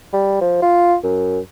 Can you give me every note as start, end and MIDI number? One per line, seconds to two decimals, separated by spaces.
0.13 0.41 55
0.41 0.63 53
0.63 0.96 65
1.03 1.40 42